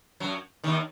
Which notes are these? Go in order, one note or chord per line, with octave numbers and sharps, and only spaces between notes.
F#2 F#3
D#2 D#3